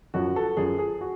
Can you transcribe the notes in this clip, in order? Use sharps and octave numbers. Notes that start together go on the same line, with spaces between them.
F#2 F3 F#4
A4
F#2 F3 G#4
G#4
F#4